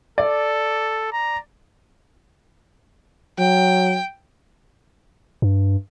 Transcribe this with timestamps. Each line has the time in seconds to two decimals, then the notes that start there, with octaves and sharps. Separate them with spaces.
0.18 A4 D5
1.12 A#5
3.39 F#3 G5
5.42 G2